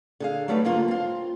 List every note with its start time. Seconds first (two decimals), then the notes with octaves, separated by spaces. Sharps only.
0.20 D3 G#4 F5
0.48 F#3 G3 A3 D#4 B4 D5
0.64 G#2 D3 A#3 F4
0.88 C4 F4